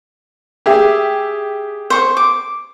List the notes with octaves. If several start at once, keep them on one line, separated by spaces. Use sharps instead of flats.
G4 G#4 E5
C5 C#6
D6